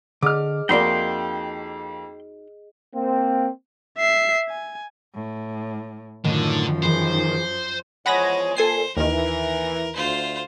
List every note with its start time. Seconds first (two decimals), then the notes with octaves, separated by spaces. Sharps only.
0.22 D3 G#4 D#5 D6 F6
0.69 F2 A#3 D#4 F#4 D5 G5 C6
2.95 A#3 C4
3.98 E5 C7
4.49 G#5
5.14 A2
6.25 F#2 A2 D3 D#3 F3
6.83 E3 G#4 C5
8.06 E2 F3 G#3 G#4 C#5 F#5 B5 A#6
8.57 A#2 A4 C5 G#5 C7
8.97 D#2 D#3 E3 A#4
9.96 D2 F4 C5